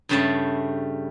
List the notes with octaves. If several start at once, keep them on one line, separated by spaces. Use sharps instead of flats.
G2 C#3 G3 A3 A5